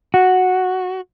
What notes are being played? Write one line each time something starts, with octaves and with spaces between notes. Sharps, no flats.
F#4